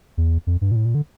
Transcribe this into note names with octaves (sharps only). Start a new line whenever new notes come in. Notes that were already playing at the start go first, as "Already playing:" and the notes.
E2
F2
G2
A#2
A2
A#2
D3